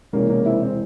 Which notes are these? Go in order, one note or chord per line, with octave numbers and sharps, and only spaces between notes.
E1 E2 C3 A#3 C#4
A#3 C#4
C4 E4
C4